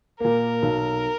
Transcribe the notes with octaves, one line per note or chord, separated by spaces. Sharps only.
A#2 A#3 A#4
B1